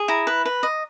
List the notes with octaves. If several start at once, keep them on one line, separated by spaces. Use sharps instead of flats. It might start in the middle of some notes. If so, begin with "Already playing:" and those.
Already playing: G#4
E4 A#5
B4
B4
D#5